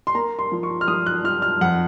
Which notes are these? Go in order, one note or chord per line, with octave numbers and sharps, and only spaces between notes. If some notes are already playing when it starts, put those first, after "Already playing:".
C6
A#3 A#5
C6
F3
C#6
F6
F3 D#6
F#6
F3 F6
F6
F2 F#5